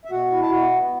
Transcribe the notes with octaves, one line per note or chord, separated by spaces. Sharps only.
E5
B2 F#4 F#5
E4
A5
B2 F#4 F#5
B3